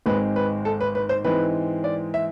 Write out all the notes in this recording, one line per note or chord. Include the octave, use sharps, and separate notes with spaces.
G#1 G#2 G#3 C4 B4
B4
A4
B4
B4
C5
G#2 E3 G#3 C4 B4
D5
E5